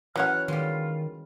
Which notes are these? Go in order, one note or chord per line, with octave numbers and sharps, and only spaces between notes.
E3 F#3 C#4 C#5 F#5 F6 F#6
D#3 G3 G#3 F4